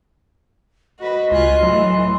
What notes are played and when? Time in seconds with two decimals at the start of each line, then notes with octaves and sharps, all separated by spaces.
1.00 F#4 B4 D#5
1.31 C#2 F4 G#5 C6 F#6
1.63 A2 E3 F#3